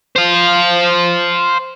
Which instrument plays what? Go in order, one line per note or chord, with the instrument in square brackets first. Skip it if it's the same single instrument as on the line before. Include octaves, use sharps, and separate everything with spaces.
[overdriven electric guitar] C5 F5